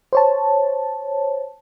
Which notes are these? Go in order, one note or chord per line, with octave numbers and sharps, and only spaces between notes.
C5 C#5 A5